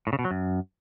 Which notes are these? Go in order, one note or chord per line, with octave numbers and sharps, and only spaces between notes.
A2
C#3
B2
F#3
F#2